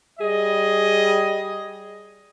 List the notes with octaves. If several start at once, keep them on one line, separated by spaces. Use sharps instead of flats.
G3 G#4 D#5